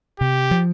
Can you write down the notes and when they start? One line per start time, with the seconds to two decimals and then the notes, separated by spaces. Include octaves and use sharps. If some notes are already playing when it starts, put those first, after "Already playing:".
0.20 C3 G4
0.51 F3